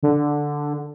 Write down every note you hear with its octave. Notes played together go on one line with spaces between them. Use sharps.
D3